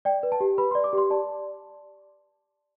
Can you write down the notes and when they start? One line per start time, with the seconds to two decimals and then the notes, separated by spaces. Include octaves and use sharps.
0.05 D5 G5
0.23 B4
0.32 A5
0.40 G4
0.58 B4 B5
0.71 C6
0.75 D5
0.84 D6
0.93 G4 C6
1.10 D5 A5